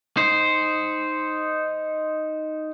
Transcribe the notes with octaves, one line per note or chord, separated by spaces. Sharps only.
D#4 C5